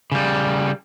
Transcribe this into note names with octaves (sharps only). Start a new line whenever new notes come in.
C#3 G3